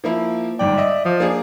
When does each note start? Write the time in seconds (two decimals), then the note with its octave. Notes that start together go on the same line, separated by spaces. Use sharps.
0.04 F3 A#3 E4
0.59 G1 G#2 D5 G5
0.78 D#5 E5
1.05 F3
1.20 A#3 D4 G#4